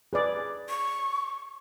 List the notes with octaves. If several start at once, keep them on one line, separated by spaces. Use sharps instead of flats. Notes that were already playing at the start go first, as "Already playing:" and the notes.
G#4 B4 D5
C#6